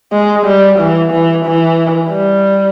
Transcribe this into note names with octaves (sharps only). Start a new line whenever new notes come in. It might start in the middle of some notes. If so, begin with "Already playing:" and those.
G#3
G3
E3
E3
E3
G3